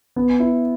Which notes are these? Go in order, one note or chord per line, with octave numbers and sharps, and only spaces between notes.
B3
E4